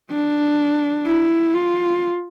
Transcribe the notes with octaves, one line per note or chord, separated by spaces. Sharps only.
D4
E4
F4